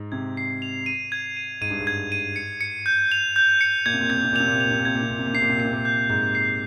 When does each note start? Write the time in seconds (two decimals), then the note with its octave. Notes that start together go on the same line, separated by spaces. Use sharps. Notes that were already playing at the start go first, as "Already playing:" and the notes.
Already playing: G#2
0.12 C3 G#6
0.37 C7
0.62 F7
0.86 D#7
1.12 G#6
1.37 D#7
1.61 G#2 D#7
1.70 G2
1.80 G#2
1.87 G#6
2.12 D#7
2.36 C#7
2.61 C#7
2.86 G6
3.12 F7
3.36 G6
3.61 C#7
3.86 A#2 G#6
3.93 C3
4.01 A#2
4.09 C3 G#6
4.17 A#2
4.25 C3
4.33 A#2
4.36 C3 F7
4.48 A#2
4.55 C3
4.61 A#2 F7
4.71 C3
4.79 A#2
4.85 C3 G#6
4.95 A#2
5.03 C3
5.10 A#2 G#6
5.19 C3
5.26 A#2
5.34 C3 C7
5.42 A#2
5.49 C3
5.57 A#2 C7
5.65 C3
5.73 A#2
5.85 G6
6.09 G#2 G6
6.35 C7